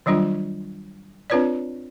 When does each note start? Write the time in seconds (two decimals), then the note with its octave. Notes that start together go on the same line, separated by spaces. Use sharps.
0.06 D#3 F#3 G3 D4 F4
1.30 C4 D4 F4 B4 C#5 D5